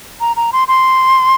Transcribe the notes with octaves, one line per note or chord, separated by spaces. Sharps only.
A#5
A#5
C6
C6